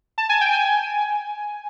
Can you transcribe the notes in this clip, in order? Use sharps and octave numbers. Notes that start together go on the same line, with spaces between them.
A5
G#5
G5
G#5